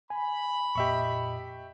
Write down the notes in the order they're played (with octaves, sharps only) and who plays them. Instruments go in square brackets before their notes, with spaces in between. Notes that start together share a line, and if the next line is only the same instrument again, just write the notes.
[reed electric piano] G#5 [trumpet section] B5
[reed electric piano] F2 A#2 D#5 [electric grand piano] G4 E5 C#6